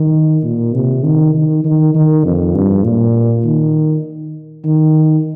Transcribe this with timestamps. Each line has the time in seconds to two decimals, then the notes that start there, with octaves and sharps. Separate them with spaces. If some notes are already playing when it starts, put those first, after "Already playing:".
Already playing: D#3
0.44 A#2
0.74 C3
1.04 D#3
1.35 D#3
1.65 D#3
1.95 D#3
2.25 F2
2.55 G2
2.84 A#2
3.45 D#3
4.64 D#3